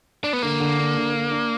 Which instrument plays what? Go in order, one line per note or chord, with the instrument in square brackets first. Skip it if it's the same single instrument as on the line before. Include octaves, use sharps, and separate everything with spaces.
[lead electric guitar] D4
B3
[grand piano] D3 [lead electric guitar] A#3
[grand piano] D3
D4
D3
D4
D4